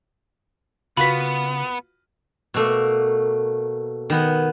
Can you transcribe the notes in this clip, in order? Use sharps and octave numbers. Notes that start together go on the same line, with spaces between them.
C#3 B3 F4 F#4 A#4 B4 B5 B6
B2 A3 A#3
D#3 B3 F#5